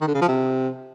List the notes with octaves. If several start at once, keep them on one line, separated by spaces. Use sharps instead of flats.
D#3
D3
C#3
F3
C3